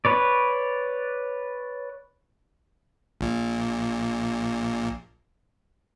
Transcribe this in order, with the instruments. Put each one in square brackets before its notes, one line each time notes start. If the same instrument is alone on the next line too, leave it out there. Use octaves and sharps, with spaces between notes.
[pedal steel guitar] B4 C#5 D5
[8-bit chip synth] A#1 A#2